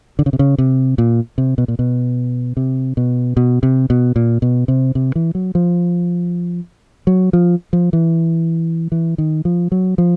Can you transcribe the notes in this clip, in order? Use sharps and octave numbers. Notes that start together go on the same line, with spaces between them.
D3
C#3
C3
C#3
C3
A#2
C3
B2
A#2
B2
C3
B2
B2
C3
B2
A#2
B2
C3
C3
E3
F#3
F3
F#3
F3
F3
E3
E3
D#3
F3
F#3
F3